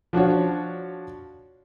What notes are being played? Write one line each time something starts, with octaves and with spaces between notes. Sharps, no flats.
F3 D4 F#4 C#5